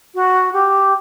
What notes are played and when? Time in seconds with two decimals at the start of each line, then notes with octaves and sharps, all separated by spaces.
0.15 F#4
0.53 G4